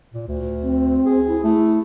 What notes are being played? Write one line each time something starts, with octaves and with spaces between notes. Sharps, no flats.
A#2
D2
C4
G#4
E4
A3 E4